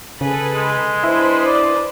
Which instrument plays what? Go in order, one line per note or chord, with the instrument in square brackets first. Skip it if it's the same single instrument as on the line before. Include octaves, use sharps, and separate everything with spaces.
[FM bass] C#3 [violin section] G#4 A4 B4
[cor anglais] G#3
[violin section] D4 B4 C5 [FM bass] E4
[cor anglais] D5